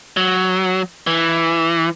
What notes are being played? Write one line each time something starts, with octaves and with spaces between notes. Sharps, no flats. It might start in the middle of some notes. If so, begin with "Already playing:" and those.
F#3
E3